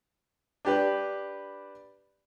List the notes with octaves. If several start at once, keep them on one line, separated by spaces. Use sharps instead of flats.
D4 G4 B4